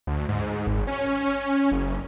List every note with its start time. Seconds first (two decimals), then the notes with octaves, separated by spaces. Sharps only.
0.07 D2
0.29 G#2
0.67 G#1
0.87 C#4
1.72 F#1